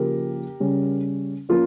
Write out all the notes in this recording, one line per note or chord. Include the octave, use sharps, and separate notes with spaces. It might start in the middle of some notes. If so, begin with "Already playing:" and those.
Already playing: C#3 F3 A#3 G4 A#4
C#3 G3 C#4
F3 A#3 C#4 F4